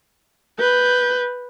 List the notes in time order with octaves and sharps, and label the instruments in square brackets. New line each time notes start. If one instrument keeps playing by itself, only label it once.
[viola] B4 [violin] G6